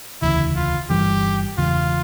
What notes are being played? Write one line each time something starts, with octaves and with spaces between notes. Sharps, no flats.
E1 D2 C#3 E3 E4
F4
G1 G2 E3 G3 G4
E1 E2 C#3 E3 F4